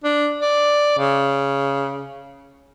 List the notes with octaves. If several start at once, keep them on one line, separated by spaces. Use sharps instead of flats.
D4
D5
C#3